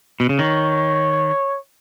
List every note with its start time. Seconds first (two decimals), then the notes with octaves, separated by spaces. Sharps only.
0.20 B2
0.29 C#3
0.39 D#3 C#5